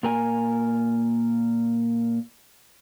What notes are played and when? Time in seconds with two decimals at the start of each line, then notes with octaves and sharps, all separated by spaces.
0.03 A#2 A#4 G#5